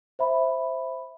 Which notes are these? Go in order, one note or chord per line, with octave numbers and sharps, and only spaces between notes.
C5 E5 B5